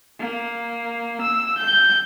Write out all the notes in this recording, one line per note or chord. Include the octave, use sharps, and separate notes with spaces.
A#3
E6
G6